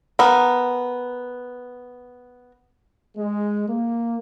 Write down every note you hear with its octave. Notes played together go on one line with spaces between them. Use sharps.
B3 A#4
G#3
A#3